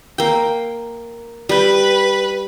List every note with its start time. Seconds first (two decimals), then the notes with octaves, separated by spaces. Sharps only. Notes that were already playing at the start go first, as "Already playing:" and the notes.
0.18 A#3 G5
1.49 G3 B4 G5